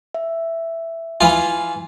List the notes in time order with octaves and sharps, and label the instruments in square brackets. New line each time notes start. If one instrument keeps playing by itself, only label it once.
[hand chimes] E5
[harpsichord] E3 F4 [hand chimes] G#5 B5